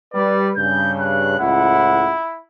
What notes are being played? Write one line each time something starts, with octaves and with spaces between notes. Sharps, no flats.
G3 B4 D5
G2 C#3 G6
F#6
C#2 A2 E4 F#5